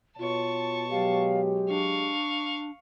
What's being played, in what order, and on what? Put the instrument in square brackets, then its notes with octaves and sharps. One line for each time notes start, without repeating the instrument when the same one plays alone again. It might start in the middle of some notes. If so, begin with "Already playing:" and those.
[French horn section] B2 C#5 [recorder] F4 [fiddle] A5 C#6
[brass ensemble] F#3 G#3 G4 [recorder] F5
[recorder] D4 [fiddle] F5 C#6